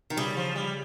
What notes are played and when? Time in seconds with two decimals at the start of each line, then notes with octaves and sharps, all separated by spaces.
0.10 D#3
0.17 C#3 G3
0.37 F3
0.55 G3